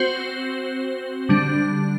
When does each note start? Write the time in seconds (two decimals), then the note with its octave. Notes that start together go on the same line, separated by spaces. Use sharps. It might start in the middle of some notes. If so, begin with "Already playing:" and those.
Already playing: C4 F#4 C5
1.29 D3 G3 D4